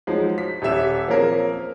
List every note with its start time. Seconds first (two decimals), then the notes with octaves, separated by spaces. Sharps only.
0.07 F3 F#3 G#3 D#4
0.38 B6
0.62 D#1 G4 E5 E7
1.08 F3 A#3 C4 C#4 G#4 A#4